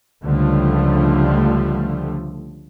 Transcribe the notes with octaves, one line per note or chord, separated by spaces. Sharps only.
C#2 D3 F3 G3 A3